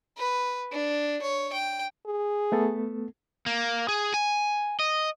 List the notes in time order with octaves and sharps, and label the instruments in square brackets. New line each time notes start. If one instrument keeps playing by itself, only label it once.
[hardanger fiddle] B4
D4
C#5
G5
[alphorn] G#4
[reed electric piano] A3 B3 A4
[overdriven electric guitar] A#3
G#4
G#5
D#5